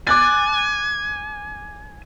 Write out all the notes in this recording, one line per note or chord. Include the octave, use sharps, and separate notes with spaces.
G#5 D6 F#6 A6